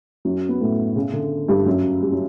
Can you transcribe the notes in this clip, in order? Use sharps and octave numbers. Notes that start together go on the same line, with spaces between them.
F#2 F#3
B3
A2 A3
C#3
D3
G2 G3
F#2 F#3
G3
F#3